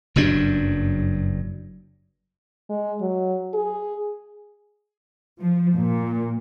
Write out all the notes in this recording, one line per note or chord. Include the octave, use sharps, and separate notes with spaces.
F#1 G2 F#3 D4
G#3
F#3
G#4
F3
A#2